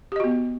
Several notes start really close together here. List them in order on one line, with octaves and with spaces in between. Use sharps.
G4 D#5 F#4 B3